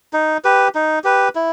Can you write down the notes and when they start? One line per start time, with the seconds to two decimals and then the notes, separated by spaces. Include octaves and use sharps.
0.13 D#4
0.44 G4 B4
0.75 D#4
1.04 G4 B4
1.35 E4